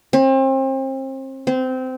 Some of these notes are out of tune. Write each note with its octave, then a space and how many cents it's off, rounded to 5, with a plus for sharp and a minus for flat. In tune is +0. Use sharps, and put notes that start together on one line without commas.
C4 +35
C4 -20